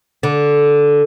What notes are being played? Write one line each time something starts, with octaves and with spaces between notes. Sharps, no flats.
D3